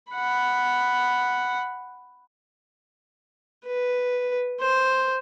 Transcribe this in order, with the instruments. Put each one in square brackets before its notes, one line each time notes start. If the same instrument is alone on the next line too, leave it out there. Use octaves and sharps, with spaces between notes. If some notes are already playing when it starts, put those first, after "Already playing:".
[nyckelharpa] F#5 B5
B4
C5